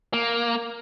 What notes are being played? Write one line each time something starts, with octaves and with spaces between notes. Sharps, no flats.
A#3